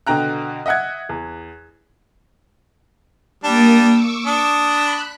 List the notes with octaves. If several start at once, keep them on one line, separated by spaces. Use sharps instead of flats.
B2 D3 G5 A#5 F#6
D#5 E5 F#5 F#6 G#6
E2
G3 A#3 D4 D#6
C#6 D6 E6
D4 D#6
B5 F#6